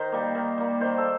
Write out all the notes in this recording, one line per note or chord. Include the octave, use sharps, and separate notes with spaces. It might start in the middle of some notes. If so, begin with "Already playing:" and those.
Already playing: D#3 C5
G3 A#3
D#3
G3 A#3
D#3 C5
A4